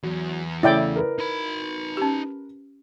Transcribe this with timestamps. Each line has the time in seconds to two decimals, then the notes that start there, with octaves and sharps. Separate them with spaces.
0.03 E2 F#3
0.63 C#3 A3 E4 C#5 D5 G5
0.96 A#4 B4
1.18 D#4 B5
1.97 C#4 G4